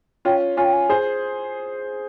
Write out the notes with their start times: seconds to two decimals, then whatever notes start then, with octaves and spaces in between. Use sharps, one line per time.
0.25 C#4 F4 G5
0.57 C#4 F4 G#5
0.65 G5
0.73 G#5
0.89 G#4 C5